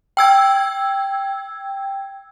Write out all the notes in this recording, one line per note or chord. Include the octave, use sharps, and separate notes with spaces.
G5 E6 G#6